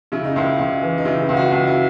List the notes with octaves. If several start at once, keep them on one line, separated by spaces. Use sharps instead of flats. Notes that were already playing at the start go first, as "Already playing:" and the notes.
C#3 E4
D#4
C#2 E4
C#2
E3
D#4
C#3 E4
C#2
F#4
C#2
E4